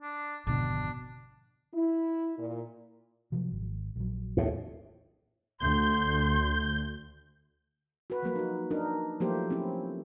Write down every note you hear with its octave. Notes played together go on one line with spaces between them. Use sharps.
D4
G#1 F2 B2 D3 D4
E4
A#2
C3 F3 F#3
G#1
A#1 F#3
D#2 A2
D2 C6 G6
F#4 B4
F3 F#3 A#3 B4
D#4 F#4
D4 D#4 A#4
F3 F#3 A3 A#3 G4 C5
C4 C#4 E4